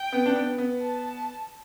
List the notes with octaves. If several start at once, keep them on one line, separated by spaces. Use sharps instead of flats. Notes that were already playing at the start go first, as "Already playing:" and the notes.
Already playing: G5
B3
D4
B3
B3
A5